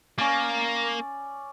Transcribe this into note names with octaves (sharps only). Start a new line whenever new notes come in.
A#3 C#4 D5